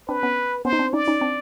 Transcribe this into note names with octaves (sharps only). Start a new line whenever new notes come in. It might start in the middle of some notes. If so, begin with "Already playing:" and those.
C4 D4 B4
B3 C#4
B3 C#4 C5
D#4
C4 D4
C#4 D#4 D5
C#4 D#4
C4 D4